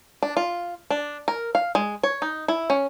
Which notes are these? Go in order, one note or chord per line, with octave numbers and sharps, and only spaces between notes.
D4
F4
D4
A#4
F5
G#3
C#5
D#4
E4
C#4